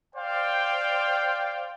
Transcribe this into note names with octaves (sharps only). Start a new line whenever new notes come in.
C5 D5 F5 G5